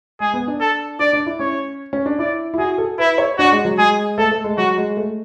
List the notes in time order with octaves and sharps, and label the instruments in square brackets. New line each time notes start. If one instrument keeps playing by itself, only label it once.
[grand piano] G#3 [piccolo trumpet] G#4
[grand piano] B3
D4
[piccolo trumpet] A4
[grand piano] D4 [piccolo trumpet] D5
[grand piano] D4
E4
[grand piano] C#4 [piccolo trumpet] C#5
[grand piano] C#4
D4
[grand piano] E4 [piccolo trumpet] D5
[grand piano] E4
[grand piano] F#4 [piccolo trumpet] G#4
[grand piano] A4
[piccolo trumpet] E4 [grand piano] B4
[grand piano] C#5
[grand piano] D4 [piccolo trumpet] F#4
[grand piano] G#3
F#3
[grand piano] G#3 [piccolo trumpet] G#4
[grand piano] A3 [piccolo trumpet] A4
[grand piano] A3
G#3
[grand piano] F#3 [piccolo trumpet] F#4
[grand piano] G#3
A3